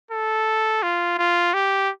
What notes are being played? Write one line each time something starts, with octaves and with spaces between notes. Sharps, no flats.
A4
F4
F4
G4